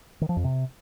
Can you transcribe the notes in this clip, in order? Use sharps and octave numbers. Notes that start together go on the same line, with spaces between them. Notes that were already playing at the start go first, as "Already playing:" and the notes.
D#3
F3
F2
C3